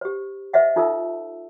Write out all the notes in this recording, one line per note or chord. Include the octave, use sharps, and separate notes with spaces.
G4 C5
C5 D#5 E5 F#5
D#4 F4 A4 E5 A5 E6